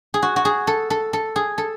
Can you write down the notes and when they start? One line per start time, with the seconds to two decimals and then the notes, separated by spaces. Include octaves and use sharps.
0.14 G#4
0.22 F#4
0.36 F#4
0.45 G#4
0.67 A4
0.90 A4
1.13 A4
1.36 G#4
1.58 A4